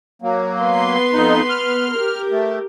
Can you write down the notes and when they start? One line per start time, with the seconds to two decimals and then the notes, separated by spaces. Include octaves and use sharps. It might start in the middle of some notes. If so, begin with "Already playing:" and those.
0.22 F#3 A#3
0.61 B3 B4 C6
1.13 F2 D#4
1.49 F6
1.93 G4 A#4
2.32 A3